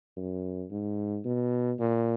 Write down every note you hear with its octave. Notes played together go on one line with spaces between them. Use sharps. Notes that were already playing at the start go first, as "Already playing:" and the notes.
F#2
G#2
B2
A#2